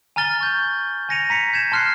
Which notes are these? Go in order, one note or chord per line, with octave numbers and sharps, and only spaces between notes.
G#5 A#5 F6 A6 G7
C#6 G6
G#5 G#6 A#6 C#7 D#7 F7
A#5 B6 C#7 F7
G6 G#6 E7
A5 C6 F6 F#6 C7